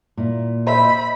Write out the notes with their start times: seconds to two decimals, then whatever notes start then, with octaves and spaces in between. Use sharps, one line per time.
0.17 A#2 E4
0.67 C5 D#5 E5 B5